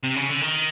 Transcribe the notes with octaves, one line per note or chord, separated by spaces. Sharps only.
C3
C#3
D3
D#3